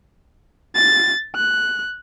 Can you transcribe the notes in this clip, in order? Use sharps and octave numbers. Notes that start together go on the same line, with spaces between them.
A6
F#6